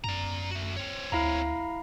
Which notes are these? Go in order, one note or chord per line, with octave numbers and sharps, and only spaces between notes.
F#2 D5 A#5
A3 F#4
C4 C#5
D2 E4 F5 A#5